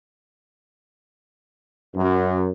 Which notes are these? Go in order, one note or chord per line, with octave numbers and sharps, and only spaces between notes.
F#2